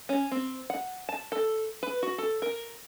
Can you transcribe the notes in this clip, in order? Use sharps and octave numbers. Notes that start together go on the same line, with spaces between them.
C#4
C4
F#5
A5
A4
B4
F#4
A4
A#4